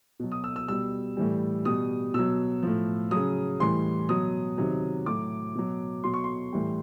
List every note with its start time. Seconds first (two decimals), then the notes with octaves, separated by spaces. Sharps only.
0.20 B2 F#3
0.32 D#6
0.44 E6
0.56 E6
0.68 B2 G3 E6
1.17 A2 E3 G3
1.65 B2 G3 D#6
2.14 B2 F#3 E6
2.63 A2 F3
3.11 C#3 F#3 D#6
3.60 A2 E3 G3 C6
4.09 B2 F#3 D#6
4.58 C3 D#3 F#3
5.06 A2 F#3 D6
5.55 B2 F#3
6.04 B2 F#3 C6
6.14 C#6
6.24 C6
6.53 A2 E3 G3